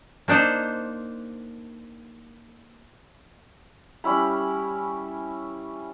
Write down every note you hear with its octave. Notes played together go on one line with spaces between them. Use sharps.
A#3 D4 D#4 C5
G3 C#4 E4 B5